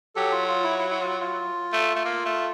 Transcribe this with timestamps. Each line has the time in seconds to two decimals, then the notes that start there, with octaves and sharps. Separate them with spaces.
0.15 F#3 G4 A4
0.32 F4
0.48 F4
0.64 E4
0.79 E4
0.91 E4
1.00 F4
1.20 F4
1.72 A3
1.96 A3
2.05 A#3
2.25 A3